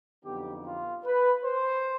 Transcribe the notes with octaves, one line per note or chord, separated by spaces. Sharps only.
F2 D3 F#3 B3 D#4 G4
F4
B4
C5